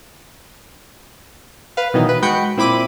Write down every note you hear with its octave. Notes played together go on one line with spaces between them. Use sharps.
B4 F5
B2 D#3 E3 F#3 D#4
B4
G#3 F#4 G5 B5 G6 C#7
A#2 C4 E4 B5 D6 D#7